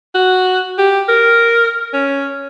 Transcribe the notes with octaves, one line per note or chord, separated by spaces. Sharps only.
F#4
G4
A#4
C#4